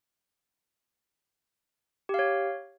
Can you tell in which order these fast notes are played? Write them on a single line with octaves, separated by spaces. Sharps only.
G4 F5 C#5